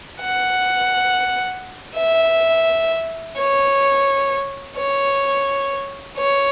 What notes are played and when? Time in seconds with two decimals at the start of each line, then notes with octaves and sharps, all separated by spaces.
0.22 F#5
1.96 E5
3.37 C#5
4.77 C#5
6.17 C#5